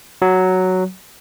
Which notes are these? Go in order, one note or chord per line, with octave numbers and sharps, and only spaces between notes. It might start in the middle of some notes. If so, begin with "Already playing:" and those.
F#3